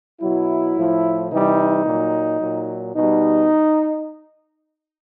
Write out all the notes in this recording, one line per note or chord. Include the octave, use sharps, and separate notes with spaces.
B2 F#3 E4
A2 F3
C3 E3 G3 D#4
A#2 F#3
A#2 F#3
B2 G3 D#4